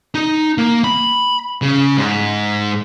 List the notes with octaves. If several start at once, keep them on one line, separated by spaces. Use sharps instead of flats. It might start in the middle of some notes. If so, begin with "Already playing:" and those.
D#4
A#3
B5
C#3
G#2